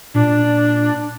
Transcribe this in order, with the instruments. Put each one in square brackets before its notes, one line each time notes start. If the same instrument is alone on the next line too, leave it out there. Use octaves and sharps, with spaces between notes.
[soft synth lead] A#2 [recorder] D4